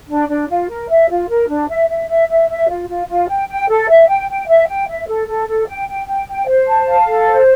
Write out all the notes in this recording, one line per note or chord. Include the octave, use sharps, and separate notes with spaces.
D4
D4
F4
A#4
E5
F4
A#4
D4
E5
E5
E5
E5
E5
F4
F4
F4
G5
G5
A4
E5
G5
G5
E5
G5
E5
A4
A4
A4
G5
G5
G5
G5
C5
A5
F5
A4
C5